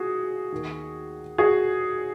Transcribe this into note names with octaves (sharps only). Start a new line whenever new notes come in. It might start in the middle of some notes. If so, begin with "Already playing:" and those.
Already playing: F#4 G#4
D#2 D#3
F#4 G#4